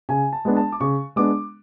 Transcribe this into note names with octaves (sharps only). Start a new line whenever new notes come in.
C#3 G#5
A5
G#3 B3 D4
A5
D6
C#3 C#6
G#3 B3 D4 D6